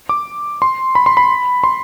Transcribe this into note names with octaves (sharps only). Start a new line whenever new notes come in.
D6
C6
B5
C6
B5
C6